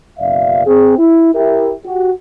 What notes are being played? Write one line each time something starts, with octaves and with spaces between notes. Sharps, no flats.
F#1 F#2 B2 D5 E5 F5
C4 G#4
E4
E4 G4 A#4 E5
F#4 G4